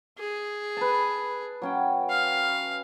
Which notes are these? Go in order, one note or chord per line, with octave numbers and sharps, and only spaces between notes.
G#4
B4 A5
F#3 C#4 G5
F5